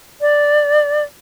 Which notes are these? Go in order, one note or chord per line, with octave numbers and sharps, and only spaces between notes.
D5